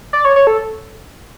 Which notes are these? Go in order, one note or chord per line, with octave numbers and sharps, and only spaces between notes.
D5
C#5
C#5
A4